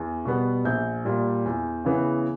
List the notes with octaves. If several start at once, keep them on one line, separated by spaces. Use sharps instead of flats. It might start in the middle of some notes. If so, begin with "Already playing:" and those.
Already playing: E2
B2 G3 B3
A#1 G6
A#2 G3
E2
C#3 E3 B3